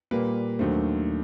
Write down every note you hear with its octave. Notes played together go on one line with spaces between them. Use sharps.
A#2 G3 A#3 B4
D#2 D3 F#3 A3 C5